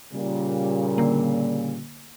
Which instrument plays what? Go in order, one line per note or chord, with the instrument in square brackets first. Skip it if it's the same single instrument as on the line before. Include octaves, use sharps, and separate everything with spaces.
[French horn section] A#2 C#3 G3
[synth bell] D3 A#3